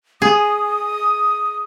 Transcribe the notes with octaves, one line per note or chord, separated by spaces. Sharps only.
G#4 D#6